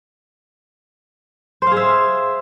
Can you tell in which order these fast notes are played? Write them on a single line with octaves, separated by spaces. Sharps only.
C5 F5 G#4 E5